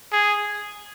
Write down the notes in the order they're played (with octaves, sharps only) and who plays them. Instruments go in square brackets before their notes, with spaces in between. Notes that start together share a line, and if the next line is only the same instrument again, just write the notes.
[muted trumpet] G#4